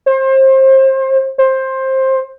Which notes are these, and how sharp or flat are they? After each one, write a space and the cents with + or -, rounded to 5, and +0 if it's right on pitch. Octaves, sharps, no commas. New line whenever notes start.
C5 +30
C5 +15